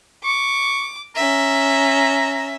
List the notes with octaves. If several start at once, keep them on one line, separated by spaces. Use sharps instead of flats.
C#6 D6
C#4 E5 A#5